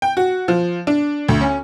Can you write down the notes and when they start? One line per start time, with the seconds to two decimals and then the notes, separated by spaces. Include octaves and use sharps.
0.02 G5
0.17 F#4
0.48 F3
0.87 D4
1.28 D2
1.41 C#4